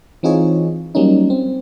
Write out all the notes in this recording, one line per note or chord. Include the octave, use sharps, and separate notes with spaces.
E3 C4 D#4 F4 G#4 C#5
F#3 G3 A#3 C#4 D#4
C4